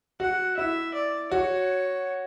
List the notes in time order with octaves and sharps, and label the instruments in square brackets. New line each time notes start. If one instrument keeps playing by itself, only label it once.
[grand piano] F#4 [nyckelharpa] F#5
[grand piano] E4 [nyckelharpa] E5
[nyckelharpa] D5
[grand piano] F#4 [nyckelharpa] C#5